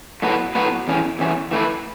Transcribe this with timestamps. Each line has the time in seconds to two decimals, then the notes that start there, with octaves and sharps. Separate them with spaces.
0.22 A2 F#3 B3 F#4 B4
0.55 A2 F#3 B3 F#4 B4
0.88 E2 E3 C#4
1.19 E2 E3 C#4
1.51 E3 A3 E4 B4